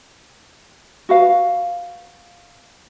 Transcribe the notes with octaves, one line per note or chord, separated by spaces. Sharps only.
F#4 B4 F5